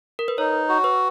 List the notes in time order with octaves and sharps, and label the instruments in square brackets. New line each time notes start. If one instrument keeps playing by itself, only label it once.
[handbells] A#4
B4
[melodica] D#4 [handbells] C#5
[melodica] F#4
[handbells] B4